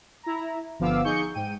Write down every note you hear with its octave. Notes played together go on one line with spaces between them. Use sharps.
E4 A#5
G1 F3 B3 F5 D6 E6
D#4 G#4 C#6 G6 C#7
G#2 G5 D#7